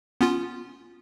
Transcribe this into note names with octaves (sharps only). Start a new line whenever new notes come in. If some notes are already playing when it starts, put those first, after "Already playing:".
B3 C#4 F4